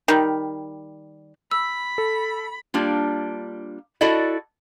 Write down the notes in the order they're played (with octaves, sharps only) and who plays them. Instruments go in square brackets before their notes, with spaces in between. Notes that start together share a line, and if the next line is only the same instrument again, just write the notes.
[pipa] D#3 G3
[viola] B5 [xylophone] E6
[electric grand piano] A4
[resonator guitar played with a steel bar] G3 A#3 D4 F4
E4 F#4 A4 D5 D#5